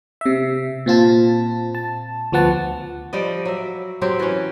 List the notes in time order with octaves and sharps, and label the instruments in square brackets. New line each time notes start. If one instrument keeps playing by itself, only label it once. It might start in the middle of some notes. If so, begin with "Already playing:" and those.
[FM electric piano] C3 E5
A#2 C4 F4 A5
A5
D2 F3 B3 F#5 A5
[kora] F3 G3 D5 D#5
F#3 E5
F#3 C4 G4
E3 C#4